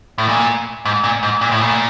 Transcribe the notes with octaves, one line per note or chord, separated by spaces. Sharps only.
A2
A#2
G#2
A#2
G#2
A#2
A2
A#2